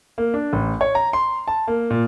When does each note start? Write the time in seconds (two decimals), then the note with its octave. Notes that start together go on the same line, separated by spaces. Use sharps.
0.18 A#3
0.34 D4
0.53 A1
0.81 C#5
0.95 A#5
1.13 C6
1.48 A5
1.68 A#3
1.90 A#2